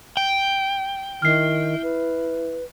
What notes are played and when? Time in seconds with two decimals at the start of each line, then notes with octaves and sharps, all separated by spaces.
0.17 G5
1.22 D#3 E4 F6 C7
1.83 B4